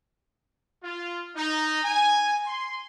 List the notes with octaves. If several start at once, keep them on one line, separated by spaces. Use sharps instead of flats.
F4
D#4
G#5
C6